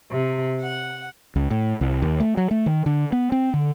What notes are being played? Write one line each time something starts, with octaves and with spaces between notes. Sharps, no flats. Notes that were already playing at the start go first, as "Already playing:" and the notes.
C3
F#5
C#2
A2
C2
D#2
A3
F#3
A3
D#3
D3
B3
C4
D3